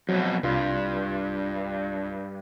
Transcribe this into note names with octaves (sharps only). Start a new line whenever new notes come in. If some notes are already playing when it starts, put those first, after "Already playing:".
F2 B2 F#3
C2 G2 F4 C6